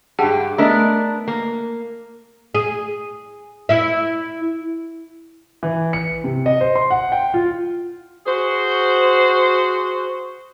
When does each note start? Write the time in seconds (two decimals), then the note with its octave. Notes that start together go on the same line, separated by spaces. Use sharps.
0.19 G2 G4 G#4 F#5 A5
0.58 A3 B3 D4 A#4 D#5
1.28 A#3
2.55 G#4
3.69 E4 E5
5.63 E3
5.93 C#7
6.24 C3
6.46 D#5
6.61 C5
6.75 C6
6.91 F#5
7.12 G5
7.34 F4
8.26 F#4 G#4 C5